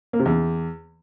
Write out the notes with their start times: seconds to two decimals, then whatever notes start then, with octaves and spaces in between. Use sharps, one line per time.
0.13 A#3
0.19 C3
0.26 E2